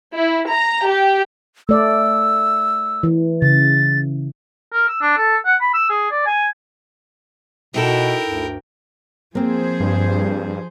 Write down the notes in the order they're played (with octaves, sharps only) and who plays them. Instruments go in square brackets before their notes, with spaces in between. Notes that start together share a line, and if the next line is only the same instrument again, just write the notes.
[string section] E4
A#5
G4
[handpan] A3 D5 [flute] E6
[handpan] E3
[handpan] C#3 [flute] A6
[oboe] A#4
E6
D4
A4
F#5
B5
E6
G#4
D5
G#5
[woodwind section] B2 [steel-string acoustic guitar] D#4 E4 A4 [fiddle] A#4 G5
[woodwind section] D2 G2
[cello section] F3 G#4 C5 [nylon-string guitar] A#3 C4
[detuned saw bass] G2